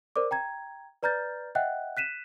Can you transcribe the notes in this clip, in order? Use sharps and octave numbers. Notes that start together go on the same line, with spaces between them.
A#4 C5 D5 D6
G5 A#5 G#6
B4 D5 A#5 F6 G6 A6
D#5 E5 F#5 G5 F#6
F#6 B6 D#7 E7